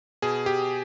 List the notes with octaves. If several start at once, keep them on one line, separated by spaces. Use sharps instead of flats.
B2 G#4
G4